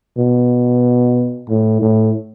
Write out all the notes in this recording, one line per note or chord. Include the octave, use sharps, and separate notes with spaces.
B2
A2
A2